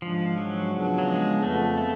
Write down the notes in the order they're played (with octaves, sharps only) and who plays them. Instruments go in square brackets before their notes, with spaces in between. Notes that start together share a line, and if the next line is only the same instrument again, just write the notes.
[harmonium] G#2 G#3 D4 [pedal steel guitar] F3
[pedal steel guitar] F#3
[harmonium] C#3 F3 B3 D4
[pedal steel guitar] F#3
G#3
[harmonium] F2 F3 B3 [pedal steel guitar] A3
[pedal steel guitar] A3